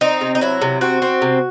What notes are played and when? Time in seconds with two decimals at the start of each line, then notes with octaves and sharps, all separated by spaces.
0.01 C4 D#4
0.21 C3
0.35 D#4
0.41 F#3 E4
0.61 C3
0.81 C4 F#4
1.02 C4
1.22 C3